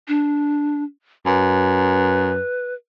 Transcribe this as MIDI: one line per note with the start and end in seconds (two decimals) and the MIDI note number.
0.08 0.84 62
1.26 2.39 42
1.26 2.74 71